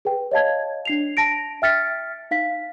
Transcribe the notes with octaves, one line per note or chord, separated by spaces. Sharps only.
G#4 B4 G5
C#5 D#5 F5 A5 G#6
D4 C7 F7
A5 A#6 D7
E5 G5 F6 A6 B6 C#7
D#4 F5 B6